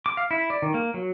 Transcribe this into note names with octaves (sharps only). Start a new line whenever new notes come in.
D6
F5
E4
D5
D#3
A#3
F#3